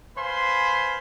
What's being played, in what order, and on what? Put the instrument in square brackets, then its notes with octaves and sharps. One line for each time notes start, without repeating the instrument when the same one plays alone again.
[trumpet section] B4 C5 F5 G#5 B5 C6